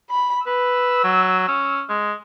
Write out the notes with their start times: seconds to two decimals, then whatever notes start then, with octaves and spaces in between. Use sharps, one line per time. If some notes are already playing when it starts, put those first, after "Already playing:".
0.10 B5
0.47 B4 E6
1.04 F#3
1.48 C#4
1.89 G#3